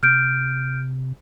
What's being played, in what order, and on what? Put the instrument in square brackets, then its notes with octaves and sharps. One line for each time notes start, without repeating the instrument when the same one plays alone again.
[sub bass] C3 [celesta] F6 G6 D7